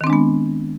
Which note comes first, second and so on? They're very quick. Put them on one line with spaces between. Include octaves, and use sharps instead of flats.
D#3 C4 D4 G#3 B3